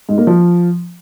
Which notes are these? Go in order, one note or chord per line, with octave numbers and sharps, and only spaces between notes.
G#2
A#3
F3